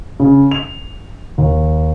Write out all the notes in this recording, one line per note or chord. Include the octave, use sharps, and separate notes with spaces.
C#3
F7
D#2